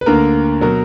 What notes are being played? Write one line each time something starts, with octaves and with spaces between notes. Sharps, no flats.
B4
D2 D3 A#3 A#4
B2 F#3 A#4